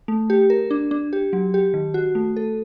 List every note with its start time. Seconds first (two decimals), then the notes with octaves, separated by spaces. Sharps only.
0.08 A3
0.30 G4
0.50 A#4
0.71 D4
0.91 D4
1.13 G4
1.33 F#3
1.54 G4
1.74 D#3
1.94 F#4
2.15 A3
2.36 A4